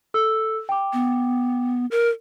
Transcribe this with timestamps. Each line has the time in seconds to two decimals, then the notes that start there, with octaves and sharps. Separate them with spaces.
0.14 A4 E6
0.69 G5 D6
0.93 B3
1.91 A#4